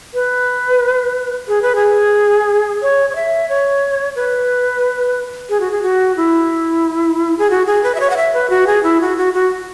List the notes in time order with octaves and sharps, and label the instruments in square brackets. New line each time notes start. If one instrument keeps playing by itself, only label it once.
[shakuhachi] B4
G#4
B4
G#4
C#5
C#5
E5
C#5
B4
G#4
F#4
G#4
F#4
E4
G#4
F#4
G#4
B4
E5
C#5
F#5
E5
B4
F#4
G#4
E4
F#4
F#4
F#4